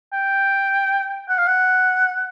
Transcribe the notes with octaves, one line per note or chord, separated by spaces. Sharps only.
G5
F#5
F5
F#5